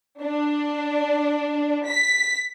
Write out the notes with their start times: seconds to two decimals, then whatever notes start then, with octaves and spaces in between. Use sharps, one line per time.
0.21 D4
1.87 B6